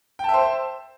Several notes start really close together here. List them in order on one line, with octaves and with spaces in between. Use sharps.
G5 A5 E5 C5